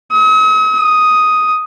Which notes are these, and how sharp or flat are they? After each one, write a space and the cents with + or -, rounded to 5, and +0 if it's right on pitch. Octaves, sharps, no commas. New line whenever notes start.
D#6 +45
D#6 +5